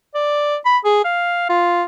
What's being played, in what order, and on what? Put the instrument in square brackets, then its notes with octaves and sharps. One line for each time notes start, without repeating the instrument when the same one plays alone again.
[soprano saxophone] D5
B5
G#4
F5
F4